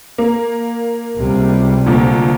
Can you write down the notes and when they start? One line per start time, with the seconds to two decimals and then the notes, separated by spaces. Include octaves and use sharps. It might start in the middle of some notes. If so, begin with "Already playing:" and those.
0.18 A#3
1.18 C#2 C3 G3
1.86 D2 A#2